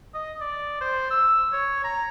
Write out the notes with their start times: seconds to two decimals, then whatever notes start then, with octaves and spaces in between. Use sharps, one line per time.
0.14 D#5
0.40 D5
0.81 C5
1.11 E6
1.52 C#5
1.84 A#5